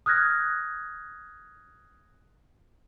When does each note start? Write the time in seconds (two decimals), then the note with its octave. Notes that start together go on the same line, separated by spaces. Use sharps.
0.06 D#6 F6 F#6 G#6 A#6